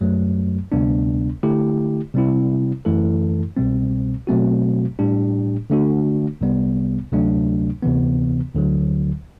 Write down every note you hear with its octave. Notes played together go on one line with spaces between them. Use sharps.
F#2 F#3 A3
D2 C3 G3 B3 D4
D3 A3 E4 G4
C3 G3 C4 E4
F#2 E3 A3 E4 A4
C2 B2 G3 C4
B2 F#3 A3 C4 F#4
A2 G3 D4 G4
D3 A3 D4 F#4
C2 C3 G3 B3
D2 C3 F#3 A3 D4
D2 C3 E3 B3
D2 D3 F#3